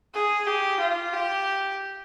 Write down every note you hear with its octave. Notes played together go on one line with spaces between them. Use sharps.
G#4
G4
F4
G4